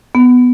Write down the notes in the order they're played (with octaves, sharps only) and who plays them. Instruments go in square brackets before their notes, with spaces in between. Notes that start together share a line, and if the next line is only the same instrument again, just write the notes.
[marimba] B3